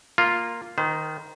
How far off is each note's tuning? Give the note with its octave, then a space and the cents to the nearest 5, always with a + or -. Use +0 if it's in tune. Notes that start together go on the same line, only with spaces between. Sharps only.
A#3 +0 F4 +0
D#3 +0 C5 -40